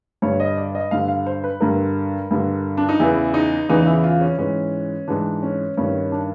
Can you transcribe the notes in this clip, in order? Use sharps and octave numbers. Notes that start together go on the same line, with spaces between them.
G2 D3 C#5
D#5
D5
D#5
G2 D3 F5
F5
C5
B4
G2 D3 A#4
G2 D3
D4
D#4
E2 C#3 E3 E4
D#4
E2 C#3 E3 D#4
E4
F4
C#4
G#2 E3 C#4
G#2 E3 D4
C#4
G2 D#3 C#4
D4